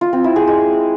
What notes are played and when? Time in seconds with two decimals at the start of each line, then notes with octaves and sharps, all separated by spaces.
0.01 F4
0.13 C4
0.24 E4
0.36 G#4
0.47 G#3